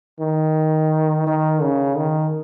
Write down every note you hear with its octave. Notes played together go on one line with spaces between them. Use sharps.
D#3
D#3
C#3
D#3